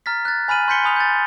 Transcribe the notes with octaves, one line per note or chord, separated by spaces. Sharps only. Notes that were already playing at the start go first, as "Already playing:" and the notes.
A#5 F6 A6 B6
F#6 A6
G#5 B5 F6 D#7 F#7
C6 G6 B6 C#7 G7
G#5 B5 D#6 F7
G6 A6